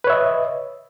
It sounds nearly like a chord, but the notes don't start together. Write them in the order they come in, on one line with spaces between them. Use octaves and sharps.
B4 C#5 E5 D#5